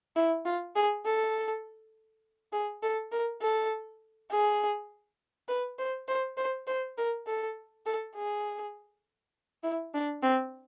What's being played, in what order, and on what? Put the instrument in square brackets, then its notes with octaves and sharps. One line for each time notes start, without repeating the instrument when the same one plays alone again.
[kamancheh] E4
F4
G#4
A4
G#4
A4
A#4
A4
G#4
B4
C5
C5
C5
C5
A#4
A4
A4
G#4
E4
D4
C4